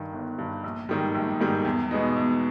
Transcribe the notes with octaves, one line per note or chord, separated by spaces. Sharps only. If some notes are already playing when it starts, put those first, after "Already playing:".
Already playing: G2 D#3
G1
G2 D#3
A#1
G#2 D#3 G3
A#1
G#2 D#3 G3
E2
B2 G#3 B3 D#4
E2